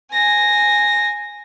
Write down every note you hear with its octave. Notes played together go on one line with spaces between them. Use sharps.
G#5 A#6